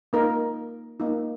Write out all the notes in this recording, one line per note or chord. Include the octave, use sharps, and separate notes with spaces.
A#3 D#4 A#4
A#3 D#4